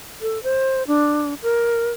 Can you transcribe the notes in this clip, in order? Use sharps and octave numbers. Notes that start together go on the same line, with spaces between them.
A4
C5
D4
A#4